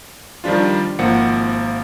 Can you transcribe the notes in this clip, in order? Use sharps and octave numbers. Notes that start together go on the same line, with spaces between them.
D#3 F3 G3 D4 F4
G#1 F3 A#3 F#5 C#7